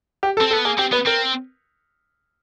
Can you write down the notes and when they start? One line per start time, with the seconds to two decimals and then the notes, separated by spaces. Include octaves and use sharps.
0.23 G4
0.37 A4
0.41 C4
0.51 B3 A4
0.65 A#3 G#4
0.79 C4 G4
0.92 B3 B4
1.06 C4 A#4